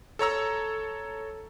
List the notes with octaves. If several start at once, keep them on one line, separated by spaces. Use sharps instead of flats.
A4 C#5 A#5 E6